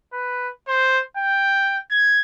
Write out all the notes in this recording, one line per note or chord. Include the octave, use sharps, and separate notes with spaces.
B4
C5
G5
G#6